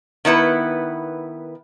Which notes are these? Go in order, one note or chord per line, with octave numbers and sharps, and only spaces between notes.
D#3 B3 E4 B4